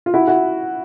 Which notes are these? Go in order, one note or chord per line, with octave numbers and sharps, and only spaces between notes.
F4
E4 F#4
E4 F#4